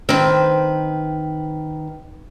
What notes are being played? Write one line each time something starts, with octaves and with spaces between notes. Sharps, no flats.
D#3 C4 B4